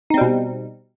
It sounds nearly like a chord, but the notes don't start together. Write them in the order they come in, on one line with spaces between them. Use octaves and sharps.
D#4 C4 G3 B2